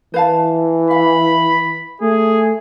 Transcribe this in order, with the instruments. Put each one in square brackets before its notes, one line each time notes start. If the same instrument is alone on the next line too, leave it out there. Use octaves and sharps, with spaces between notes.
[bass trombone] E3 [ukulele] B4 F5 A5
[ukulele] F5 [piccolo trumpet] B5
[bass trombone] A3 [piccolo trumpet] G#4